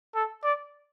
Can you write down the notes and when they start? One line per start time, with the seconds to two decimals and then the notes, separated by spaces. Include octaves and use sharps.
0.15 A4
0.44 D5